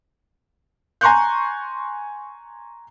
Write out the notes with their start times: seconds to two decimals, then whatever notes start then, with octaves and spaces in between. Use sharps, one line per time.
1.01 G#5 A#5 C6 C#6 F#6 G6